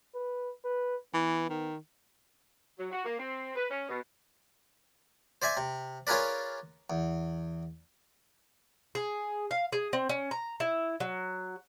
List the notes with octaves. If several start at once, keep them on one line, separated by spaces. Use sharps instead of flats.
B4
B4
E3 B3
D#3
F#3
F#4
A#3
C4
B4
C#4
B2
C5 D5 E5 G#5
C3
C#4 F4 G#4 A#4 B4 D5
E2
G#4
F5
G#4
C4
C#4
A#5
E4
F#3